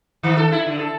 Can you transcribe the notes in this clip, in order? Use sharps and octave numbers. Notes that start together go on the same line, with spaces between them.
D#3
A4
E4
D3
A4